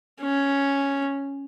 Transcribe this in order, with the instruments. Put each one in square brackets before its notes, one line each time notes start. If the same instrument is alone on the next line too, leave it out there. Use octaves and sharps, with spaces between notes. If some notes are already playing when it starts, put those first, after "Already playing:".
[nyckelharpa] C#4